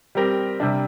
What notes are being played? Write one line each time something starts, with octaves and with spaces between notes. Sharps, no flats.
G3 C4 G4 A#4
C3 G3 D4